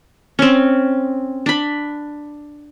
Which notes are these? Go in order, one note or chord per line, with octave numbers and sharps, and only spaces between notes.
C4 C#4
D4 B5